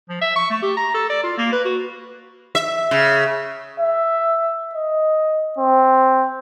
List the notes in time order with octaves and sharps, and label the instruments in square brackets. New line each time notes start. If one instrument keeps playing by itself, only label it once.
[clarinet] F3
E5
C#6
A3
G4
A#5
A4
D5
F4
A#3
B4
F#4
[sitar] E5
C#3
[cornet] E5
D#5
C4